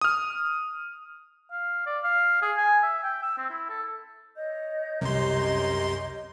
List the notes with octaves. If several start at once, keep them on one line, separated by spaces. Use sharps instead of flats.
D#6 F6
F5
D5
F5
G#4
G#5
E5
G5
E6
C4
E4
A4
C#5 D#5 G6
C2 F#2 C3 A#5 C6